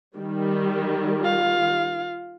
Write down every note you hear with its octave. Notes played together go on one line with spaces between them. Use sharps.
D#3 G3
F4 F5